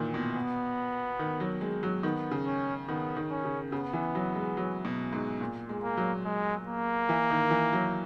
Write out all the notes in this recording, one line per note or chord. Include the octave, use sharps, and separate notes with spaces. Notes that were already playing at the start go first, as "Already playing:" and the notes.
Already playing: A#2 D#3 E3
B2
B3
D#3
F#3
G#3
F#3
D#3 B3
C#3
C#4
D#3 B3
D#3
C#4
C#3
C#3 B3
E3
F#3
G#3
F#3
B2
G#2
A#2
G#3
A#3
F#3
G#3
A#3
E3
D#3
E3
F#3